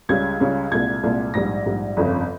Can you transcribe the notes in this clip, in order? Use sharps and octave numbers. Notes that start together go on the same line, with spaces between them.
C#2 C#3 G3 G#6
C#2 C#3 G3
C2 A#2 G#3 G#6
C2 A#2 G#3
A#1 G#2 G3 A#6
A#1 G#2 G3
G1 F2 C#3